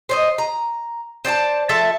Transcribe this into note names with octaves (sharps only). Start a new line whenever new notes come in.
C5 C#5 D#5
A#5
C5 D5 G5 A5
F3 A4 E5 A5